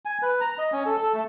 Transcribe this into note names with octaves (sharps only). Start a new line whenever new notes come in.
G#5
B4
A#5
D#5
C#4
A4
A4
A3